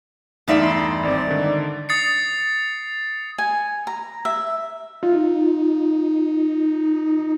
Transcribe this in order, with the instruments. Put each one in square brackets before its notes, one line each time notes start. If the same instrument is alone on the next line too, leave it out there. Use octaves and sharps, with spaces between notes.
[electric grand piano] E2 A3 D5 [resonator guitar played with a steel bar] G2 D#4 E5
[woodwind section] D#5 B5 C6
[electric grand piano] G#1 C4 [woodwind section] G3 G#3 D5
[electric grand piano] D3 D#3
[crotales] D#6 A6 C7 C#7
[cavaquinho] G#5
A#5
E5
[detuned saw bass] D#4 [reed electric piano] F4